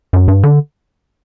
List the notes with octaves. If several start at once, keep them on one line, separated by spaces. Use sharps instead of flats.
F#2
G2
D3